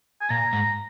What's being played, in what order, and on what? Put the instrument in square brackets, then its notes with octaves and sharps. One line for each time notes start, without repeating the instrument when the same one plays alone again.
[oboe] G#5
[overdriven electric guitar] A#2 [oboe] A#5
[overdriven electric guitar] G#2